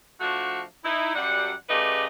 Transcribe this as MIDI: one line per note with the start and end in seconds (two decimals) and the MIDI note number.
0.20 0.61 53
0.20 0.61 57
0.20 0.61 62
0.20 0.61 66
0.83 1.14 63
0.83 1.14 64
1.15 1.51 42
1.15 1.51 55
1.15 1.51 78
1.69 2.07 49
1.69 2.07 57
1.69 2.07 67
1.69 2.07 71
1.69 2.07 74
1.69 2.07 75